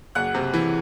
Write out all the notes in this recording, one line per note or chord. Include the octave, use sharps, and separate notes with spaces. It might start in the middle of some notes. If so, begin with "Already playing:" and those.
F#1 F#5 F#6
C3
E3